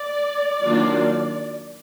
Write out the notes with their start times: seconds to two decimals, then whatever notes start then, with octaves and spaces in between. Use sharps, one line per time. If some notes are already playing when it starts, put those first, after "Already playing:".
Already playing: D5
0.64 D#3 F#3 A#3 D4 F4